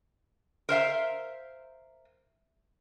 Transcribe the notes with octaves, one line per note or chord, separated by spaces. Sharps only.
A#4 C5 E5 F5